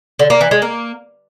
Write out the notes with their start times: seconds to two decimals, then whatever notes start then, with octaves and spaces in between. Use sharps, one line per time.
0.19 D3
0.30 A#3
0.41 E3
0.51 G#3
0.62 A#3